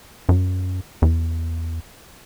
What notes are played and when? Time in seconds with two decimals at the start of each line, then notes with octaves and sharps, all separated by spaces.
0.29 F#2
1.02 E2